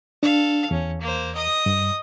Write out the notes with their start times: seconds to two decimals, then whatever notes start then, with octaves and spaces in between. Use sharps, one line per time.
0.23 D4 A4 F5
0.71 E2 C#4
1.01 A#3 C5
1.35 D#5 D#6
1.66 G2